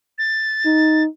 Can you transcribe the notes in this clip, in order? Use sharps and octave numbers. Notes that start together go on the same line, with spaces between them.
A6
D#4